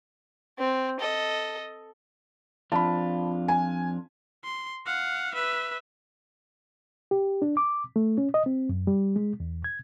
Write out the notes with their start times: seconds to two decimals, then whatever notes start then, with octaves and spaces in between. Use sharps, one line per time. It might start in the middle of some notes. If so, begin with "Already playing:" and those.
0.59 C4
1.00 A4 D#5
2.72 F2 D4 F4 A5 B5
3.48 G#5
4.44 C6
4.86 F5 F#5
5.34 B4 E5
7.11 G4
7.42 D4
7.57 D6
7.96 A3
8.18 C#4
8.34 D#5
8.46 C4
8.69 F#2
8.87 G3
9.16 G#3
9.40 E2
9.64 G#6